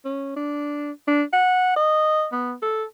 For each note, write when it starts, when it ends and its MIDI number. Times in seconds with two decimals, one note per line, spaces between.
0.05 0.32 61
0.36 0.92 62
1.07 1.23 62
1.33 1.73 78
1.76 2.26 75
2.32 2.54 59
2.62 2.83 69